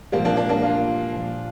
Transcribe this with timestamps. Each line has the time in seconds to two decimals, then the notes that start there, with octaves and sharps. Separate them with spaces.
0.12 A#2 F3 G3 A#3
0.25 A#3 D4
0.37 A#3 D4
0.49 A#3 D4
0.62 D4 F4
1.12 A#2 F3